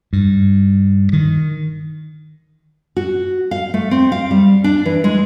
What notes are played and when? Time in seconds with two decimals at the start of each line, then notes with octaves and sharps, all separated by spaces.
0.13 G2
1.13 D#3
2.97 F#4
3.51 F5
3.74 A3
3.91 C4
4.12 F5
4.31 G3
4.64 D4
4.85 E3
5.04 G#3